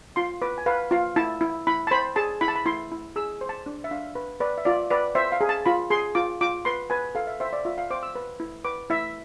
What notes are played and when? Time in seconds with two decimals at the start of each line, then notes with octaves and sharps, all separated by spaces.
0.16 F4 C6
0.42 B4 D6
0.58 G#5
0.66 B4 F5
0.91 F4 F5
1.16 E4 A5
1.41 E4
1.67 E4 B5
1.87 A5
1.91 C5 B5
2.16 G#4 A5
2.41 E4 B5
2.48 A5
2.56 B5
2.66 E4 C6
2.92 E4
3.16 G#4 E6
3.41 C5
3.49 A5
3.66 D4
3.84 E5
3.91 D4 F5
4.15 B4
4.40 B4 D5
4.58 E5
4.65 F4 D5
4.90 B4 D5
5.15 C5 E5
5.32 F5
5.41 G#4
5.49 A5
5.66 F4 B5
5.90 G#4 C6
6.15 F4 D6
6.41 F4 D6
6.65 B4 C6
6.90 B4 G#5
7.15 A4 F5
7.27 E5
7.40 C5 E5
7.53 D5
7.65 F4 E5
7.78 F5
7.90 C5 D6
8.03 E6
8.15 B4
8.40 E4
8.65 B4 D6
8.90 E4 E5